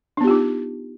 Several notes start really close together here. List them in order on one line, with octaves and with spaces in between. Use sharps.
D4 B3 G4 F4 D#4